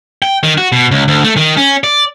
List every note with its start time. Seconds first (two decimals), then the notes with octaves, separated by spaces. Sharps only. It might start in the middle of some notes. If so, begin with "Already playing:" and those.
0.22 G5
0.43 D#3
0.58 F#4
0.72 B2
0.91 C#2
1.08 D2
1.24 A3
1.37 D#3
1.57 C#4
1.84 D5